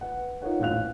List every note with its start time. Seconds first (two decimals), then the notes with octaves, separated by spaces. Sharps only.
0.01 B4 F#5
0.42 D#4 F4 A#4 C#5 F#5
0.60 D#1 A1 F5 F#6 F7